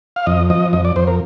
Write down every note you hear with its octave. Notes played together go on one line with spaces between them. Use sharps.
F5
F2 D#5
F3 D#5
F2 D#5
D5
F2 C5
A#4